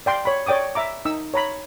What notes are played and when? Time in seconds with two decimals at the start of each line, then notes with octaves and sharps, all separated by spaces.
0.06 D5 G5 C6
0.25 C#5 B5
0.46 C#5 D5 G5 D6 D#6
0.75 E5 A#5 D6
1.05 D#4 E6
1.34 C#5 A#5 B5